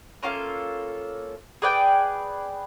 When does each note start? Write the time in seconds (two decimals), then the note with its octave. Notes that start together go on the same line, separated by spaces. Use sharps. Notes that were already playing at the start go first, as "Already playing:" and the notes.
0.23 A#3 C#4 F4 A4
1.62 G#4 B4 D5 G5